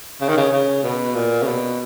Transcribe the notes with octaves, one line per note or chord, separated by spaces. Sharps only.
C#3
D#3
C#3
C#3
B2
A#2
C#3
B2